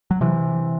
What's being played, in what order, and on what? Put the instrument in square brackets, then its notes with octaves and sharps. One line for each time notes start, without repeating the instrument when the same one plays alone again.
[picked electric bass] F#3
C3 E3